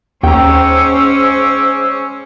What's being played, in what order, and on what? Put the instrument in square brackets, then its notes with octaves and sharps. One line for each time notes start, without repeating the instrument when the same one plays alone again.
[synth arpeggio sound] D#2 [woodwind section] G#2 D6 E6 [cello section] C#4 C5 [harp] G5 A#5